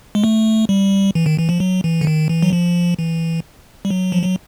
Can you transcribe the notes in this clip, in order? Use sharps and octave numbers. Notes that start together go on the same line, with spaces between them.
G#3
A3
G3
E3
D#3
E3
F3
F#3
E3
D3
D#3
E3
F#3
F3
E3
G3
F#3
F3
F#3